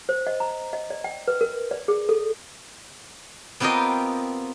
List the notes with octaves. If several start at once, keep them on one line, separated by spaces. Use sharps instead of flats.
C5
D#5
A#5
D#5
D5
G5
B4
A#4
D5
G#4
A4
B3 C4 F4 G4 A#4 D#5